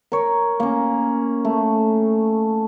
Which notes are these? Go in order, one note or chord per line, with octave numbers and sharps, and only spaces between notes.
A#4 C#5
A#3 C#4
A3